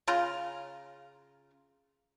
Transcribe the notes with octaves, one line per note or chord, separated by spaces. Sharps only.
C#3 F4 A#5 C6